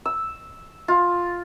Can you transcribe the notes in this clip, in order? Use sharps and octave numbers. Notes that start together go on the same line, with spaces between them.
E6
F4